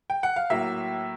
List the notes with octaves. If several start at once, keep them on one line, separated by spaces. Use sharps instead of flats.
G5
F#5
F5
A2 F#3 A#3 E5